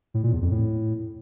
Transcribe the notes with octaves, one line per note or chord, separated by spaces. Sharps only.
A2
A#2
E2
F2
A2